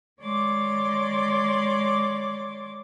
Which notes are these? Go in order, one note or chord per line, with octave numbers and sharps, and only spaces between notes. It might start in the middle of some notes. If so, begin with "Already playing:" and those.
D#3 G#3 C#5 D5 C6 D6